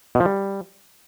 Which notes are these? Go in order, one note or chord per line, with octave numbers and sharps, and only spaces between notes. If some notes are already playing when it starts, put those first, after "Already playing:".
B2
F3
G3